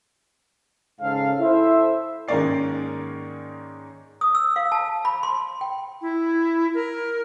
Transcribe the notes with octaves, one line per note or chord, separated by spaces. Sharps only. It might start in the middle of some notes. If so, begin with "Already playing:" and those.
G#2 C#3 A4 F5
E4 A4 C5 E5
G#2 D#3 A#3 C#4 D5 C7
D#6
E6
F5
A5
B5
C6
G5
E4
A#4